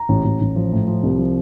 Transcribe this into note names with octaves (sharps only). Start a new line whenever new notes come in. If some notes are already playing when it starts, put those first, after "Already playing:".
Already playing: A#5
A1
A1
A1
F3
A2
F3
C2
F3